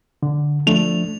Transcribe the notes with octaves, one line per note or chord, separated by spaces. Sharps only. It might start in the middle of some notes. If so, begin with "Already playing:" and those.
D3
F3 A3 D4 F7